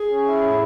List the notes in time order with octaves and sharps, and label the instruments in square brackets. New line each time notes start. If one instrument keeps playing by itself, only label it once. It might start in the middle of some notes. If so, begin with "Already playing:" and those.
Already playing: [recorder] G#4
[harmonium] C#4
E4
A2